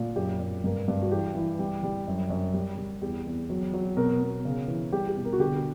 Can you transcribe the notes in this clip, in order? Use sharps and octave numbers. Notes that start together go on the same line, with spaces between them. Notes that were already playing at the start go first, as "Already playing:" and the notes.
Already playing: A#2
F#2 G4
F#2
G2 A#4
G2
F#4
E3 G4
E3
G3
G3
F#2
F#2
G3
G3
E2 G4
E2
F#3
F#3
B2 A#4
B2
C#3
E3
G3 G4
G4
B2
A#4
F#4
D3 G4